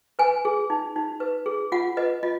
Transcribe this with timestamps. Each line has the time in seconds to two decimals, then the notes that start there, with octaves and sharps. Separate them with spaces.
0.19 B4 G#5
0.45 G#4
0.70 D#4
0.96 D#4
1.20 B4
1.46 G#4
1.72 F4 F#5
1.97 B4 D#5
2.23 F4 D#5